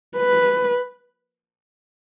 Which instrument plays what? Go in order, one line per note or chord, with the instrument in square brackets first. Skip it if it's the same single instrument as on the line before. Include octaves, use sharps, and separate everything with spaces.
[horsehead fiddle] B4